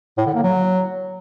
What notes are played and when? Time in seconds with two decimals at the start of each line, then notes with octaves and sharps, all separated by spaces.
0.18 A2
0.26 D3
0.35 A#3
0.43 F#3